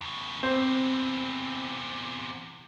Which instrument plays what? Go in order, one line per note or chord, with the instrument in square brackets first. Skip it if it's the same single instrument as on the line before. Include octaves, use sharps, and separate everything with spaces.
[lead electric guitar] E2 C#3
[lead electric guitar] E2 C3 [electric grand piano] C4 [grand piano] C5